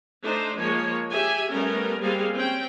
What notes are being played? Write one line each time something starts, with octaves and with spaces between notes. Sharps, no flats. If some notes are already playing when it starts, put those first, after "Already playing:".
A3 D4 D#4 C5
F3 G#3 A#3 C#5
G4 G#4 E5 G#5
G3 A3 B3 C#4 A#4
G3 G#3 A#3 C4 G#4 F5
C4 C#4 G5